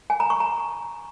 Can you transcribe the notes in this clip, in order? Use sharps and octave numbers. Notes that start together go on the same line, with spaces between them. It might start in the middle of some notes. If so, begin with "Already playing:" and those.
G#5
A#5
C#6
A#5